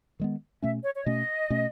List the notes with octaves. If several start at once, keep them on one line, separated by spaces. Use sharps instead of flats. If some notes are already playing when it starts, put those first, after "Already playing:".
D#3 G#3 B3
B2 A3 C#4 E5
C#5
C#5
B2 A3 C#4 D#5
B2 A3 C#4